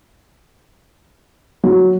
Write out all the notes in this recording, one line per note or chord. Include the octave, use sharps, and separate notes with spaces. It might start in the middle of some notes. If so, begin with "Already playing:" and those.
F#3